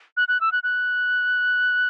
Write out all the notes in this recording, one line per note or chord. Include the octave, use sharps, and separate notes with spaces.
F#6
F#6
E6
F#6
F#6